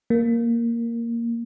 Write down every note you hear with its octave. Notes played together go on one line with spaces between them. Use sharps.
A#3